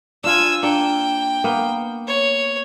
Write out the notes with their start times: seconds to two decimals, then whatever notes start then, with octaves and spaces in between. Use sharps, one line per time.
0.24 D4 F4 G#5 E6
0.63 A#3 D4 A4 G5
1.44 A#3 B3
2.07 C#5